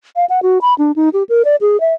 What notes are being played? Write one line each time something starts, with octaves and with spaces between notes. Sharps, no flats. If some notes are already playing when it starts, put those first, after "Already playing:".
F5
F#5
F#4
B5
D4
D#4
G4
A#4
D5
G#4
E5